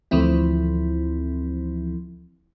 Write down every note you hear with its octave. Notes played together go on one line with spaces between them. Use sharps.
D2 E3 F3 C4 E4